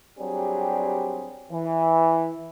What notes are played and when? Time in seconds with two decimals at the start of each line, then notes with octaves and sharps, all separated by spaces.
0.19 F#3 G3 C4 D4 G4 G#4
1.52 E3